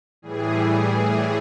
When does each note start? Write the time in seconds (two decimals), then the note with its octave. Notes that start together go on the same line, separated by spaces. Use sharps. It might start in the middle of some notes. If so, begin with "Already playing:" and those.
0.22 A2 E3 G3 G#4